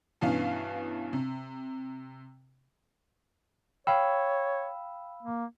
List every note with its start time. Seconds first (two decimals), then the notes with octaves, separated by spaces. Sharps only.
0.21 G2 B2 E3 B3 C#4 F5
1.13 C3
3.87 C#5 F5 G5 B5 E6
5.23 A#3